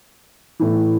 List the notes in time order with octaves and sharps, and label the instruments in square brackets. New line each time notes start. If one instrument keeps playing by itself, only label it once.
[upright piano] A2 E3